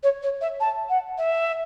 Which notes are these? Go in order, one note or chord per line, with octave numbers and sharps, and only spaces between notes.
C#5
C#5
E5
A5
F#5
E5